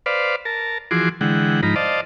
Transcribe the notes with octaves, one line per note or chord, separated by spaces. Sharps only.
B4 C5 D5 F5
A#4 A5
E3 F3 F#4 G#4 C6 D6
D3 E3 G#3 F#5 G5
G#2 F3 D#4 A#5 B5
C5 D5 D#5 F5 A5